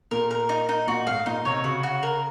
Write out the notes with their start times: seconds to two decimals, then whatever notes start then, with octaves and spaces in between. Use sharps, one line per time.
0.11 A#2 A#4
0.31 A#4
0.49 D#4
0.69 D#4
0.87 A#2 F#4
1.07 G#2 F5
1.26 A#2 D#4
1.45 C3 C#5
1.64 C#3 F#4
1.83 F#4
2.03 A#4